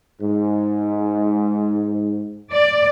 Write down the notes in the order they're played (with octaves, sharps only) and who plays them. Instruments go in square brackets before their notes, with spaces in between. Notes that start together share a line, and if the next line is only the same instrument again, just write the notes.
[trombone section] G#2
[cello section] D5